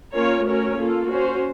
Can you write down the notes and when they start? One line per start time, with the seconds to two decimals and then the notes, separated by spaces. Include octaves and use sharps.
0.14 A#3 C#4 F4 A#4 C#5
0.46 A3 C#4 F#4 A#4 C#5
0.79 A#3 F4 A4
1.11 C#4 F#4 C5